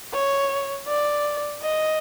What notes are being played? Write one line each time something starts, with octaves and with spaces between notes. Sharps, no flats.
C#5
D5
D#5